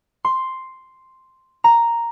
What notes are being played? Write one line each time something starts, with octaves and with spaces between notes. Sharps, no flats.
C6
A#5